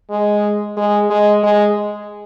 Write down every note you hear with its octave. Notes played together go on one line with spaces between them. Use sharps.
G#3
G#3
G#3
G#3